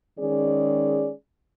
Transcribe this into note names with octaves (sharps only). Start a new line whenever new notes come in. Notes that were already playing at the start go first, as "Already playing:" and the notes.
D#3 G#3 C#4 G#4 D5